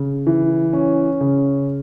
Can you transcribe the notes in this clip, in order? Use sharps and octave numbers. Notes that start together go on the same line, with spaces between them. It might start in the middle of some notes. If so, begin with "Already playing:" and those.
Already playing: C#3
E3
C#4
C#3